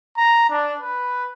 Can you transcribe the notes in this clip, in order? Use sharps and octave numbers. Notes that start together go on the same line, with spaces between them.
A#5
D4
B4